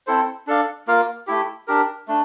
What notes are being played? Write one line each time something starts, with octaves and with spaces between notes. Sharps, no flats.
C4 E4 A4 C5
D4 A4 D5 F5
A#3 F4 A#4 F5
A3 E4 G4
D4 G4 A#4
A3 D4